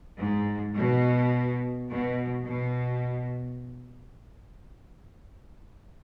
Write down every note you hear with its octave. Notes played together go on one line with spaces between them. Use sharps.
G#2
B2
B2
B2